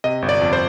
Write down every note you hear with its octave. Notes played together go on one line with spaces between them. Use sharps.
C3 D#5
G1
D5
F2
C5